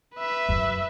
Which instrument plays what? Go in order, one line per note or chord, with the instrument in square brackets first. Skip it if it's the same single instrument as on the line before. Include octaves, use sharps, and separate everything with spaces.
[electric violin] B4 E5
[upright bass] F#2